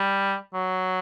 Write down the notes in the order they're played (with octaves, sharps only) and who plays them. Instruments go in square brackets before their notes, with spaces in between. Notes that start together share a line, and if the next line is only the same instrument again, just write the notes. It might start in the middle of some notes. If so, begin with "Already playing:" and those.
Already playing: [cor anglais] G3
F#3